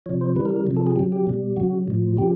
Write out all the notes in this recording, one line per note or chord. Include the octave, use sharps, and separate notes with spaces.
C3 F3 C#5
C5
C#3 E3 G3 B4
A#4
A#4
C3 F3
A4
G#4
C#3 F#3 G4
G4
B2 G3
C#3 F#3 F#4
A2 F3
C#3 F3 G4